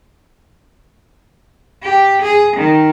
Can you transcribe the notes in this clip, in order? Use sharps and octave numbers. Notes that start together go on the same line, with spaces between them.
G4
G#4
D#3